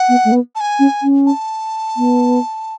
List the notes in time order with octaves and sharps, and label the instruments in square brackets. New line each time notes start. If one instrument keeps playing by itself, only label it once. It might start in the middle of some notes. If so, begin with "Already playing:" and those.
Already playing: [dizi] F#5
[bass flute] B3
A3
B3
[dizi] A5
G#5
[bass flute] C#4
C#4
[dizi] A5
[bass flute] B3